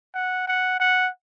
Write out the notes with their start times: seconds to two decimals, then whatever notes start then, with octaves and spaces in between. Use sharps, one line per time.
0.14 F#5
0.47 F#5
0.79 F#5